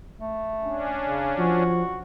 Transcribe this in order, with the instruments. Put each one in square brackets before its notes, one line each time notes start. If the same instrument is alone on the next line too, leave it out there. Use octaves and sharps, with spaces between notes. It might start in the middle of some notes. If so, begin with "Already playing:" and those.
[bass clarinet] A3
[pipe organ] C#4 D4
[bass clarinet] C#3
[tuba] F3 [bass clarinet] F#4